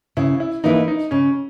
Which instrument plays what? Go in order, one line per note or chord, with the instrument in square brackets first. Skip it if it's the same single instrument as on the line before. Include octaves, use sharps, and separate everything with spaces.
[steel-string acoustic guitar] C#3 [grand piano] E4
[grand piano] E4
[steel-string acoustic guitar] E3 A#3 E4 B4 [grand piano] D#4
[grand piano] D#4
[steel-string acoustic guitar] C#3 [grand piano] C#4